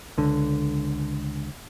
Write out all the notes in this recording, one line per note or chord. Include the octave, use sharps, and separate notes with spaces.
C#2 D3